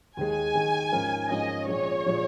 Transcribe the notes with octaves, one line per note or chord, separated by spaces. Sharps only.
D#2 D#3 G#3 G#5
D#2 D#3 G#3
G#2 F3 C#4 A#4
G#2 F3 C#4 A#4 D#5
A#1 A#2 F3 G#3 C#5
A#2 F3 G#3